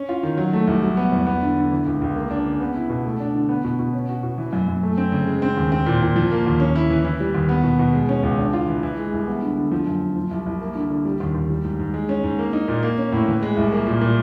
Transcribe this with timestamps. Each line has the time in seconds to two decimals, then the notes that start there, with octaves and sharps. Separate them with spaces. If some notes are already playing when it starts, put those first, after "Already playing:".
Already playing: C#4
0.09 F4
0.23 D#3
0.37 F#3
0.53 A3
0.67 C2
0.83 F#3
0.97 B3
1.12 E2
1.27 B3
1.42 D3
1.57 D3
1.72 E3
1.86 C#2
2.01 C#2
2.16 A#3
2.31 D4
2.46 C#3
2.60 B3
2.75 E4
2.90 B2
3.05 A3
3.20 D4
3.35 D3
3.49 B3
3.64 B2
3.79 B2
3.93 C#4
4.09 F#4
4.23 B2
4.38 E3
4.53 F#2
4.68 F#2
4.83 A3
4.98 C4
5.12 C#3
5.27 G#3
5.42 C4
5.57 D#2
5.72 C4
5.86 A#2
6.01 A#2
6.16 F3
6.31 A#3
6.46 D#2
6.60 C#4
6.75 E4
6.90 E3
7.04 E3
7.20 G3
7.34 D#2
7.49 B3
7.64 B2
7.79 B2
7.93 G#3
8.09 C#4
8.23 C#2
8.38 D4
8.53 F4
8.68 E3
8.83 E3
8.98 G#3
9.13 C2
9.27 B3
9.42 D3
9.57 D3
9.72 F3
9.87 F#2
10.01 F#2
10.16 F3
10.31 C2
10.46 C2
10.61 A#3
10.75 D3
10.90 D3
11.05 G3
11.20 D#2
11.34 D#2
11.50 G3
11.64 G#2
11.79 G#2
11.94 G#3
12.09 C#4
12.24 G#2
12.39 A#3
12.53 D#4
12.68 A#2
12.83 A#3
12.97 C#4
13.12 A2
13.28 E3
13.43 G#3
13.57 C2
13.72 A#3
13.87 A#2
14.01 A#2